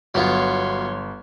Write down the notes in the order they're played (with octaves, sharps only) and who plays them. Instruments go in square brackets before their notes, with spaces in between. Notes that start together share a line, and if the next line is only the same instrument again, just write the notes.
[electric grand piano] G1 [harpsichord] F#3 B3 F4 [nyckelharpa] C#5 C6